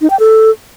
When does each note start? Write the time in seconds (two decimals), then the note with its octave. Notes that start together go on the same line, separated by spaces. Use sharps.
0.01 D#4
0.10 G5
0.20 A4